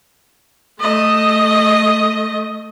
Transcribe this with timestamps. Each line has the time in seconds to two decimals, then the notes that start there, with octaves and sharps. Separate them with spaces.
0.80 A3 D#5